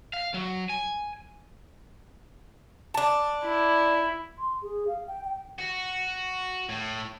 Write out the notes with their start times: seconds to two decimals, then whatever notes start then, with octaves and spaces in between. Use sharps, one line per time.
0.13 F5
0.34 F#3
0.70 G#5
2.94 D4 A5
3.45 E4
4.38 C6
4.62 G#4
4.88 F5
5.08 G5
5.25 G5
5.58 F#4
6.69 A2